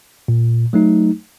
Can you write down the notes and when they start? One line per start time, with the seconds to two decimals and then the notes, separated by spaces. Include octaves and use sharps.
0.28 A#2
0.73 F#3 A3 D#4